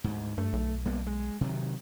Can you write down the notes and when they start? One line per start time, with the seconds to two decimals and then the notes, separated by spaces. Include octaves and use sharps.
0.04 D2 G#2
0.38 G2 A3
0.53 B1
0.86 G3 A#3 B3
1.06 G#3
1.41 C3 D#3 F#3